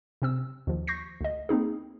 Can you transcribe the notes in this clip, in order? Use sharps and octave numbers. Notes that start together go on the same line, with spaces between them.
C3 C4 E6
D#2 F3
C#6 G6 A#6 C7
D2 D#5
A#3 C4 D#4 G#4